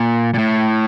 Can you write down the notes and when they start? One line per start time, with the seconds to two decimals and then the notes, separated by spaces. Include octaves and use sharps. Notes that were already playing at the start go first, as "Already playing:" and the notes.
Already playing: A#2
0.34 A#2
0.38 A2